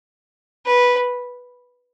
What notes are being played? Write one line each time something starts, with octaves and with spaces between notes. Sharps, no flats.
B4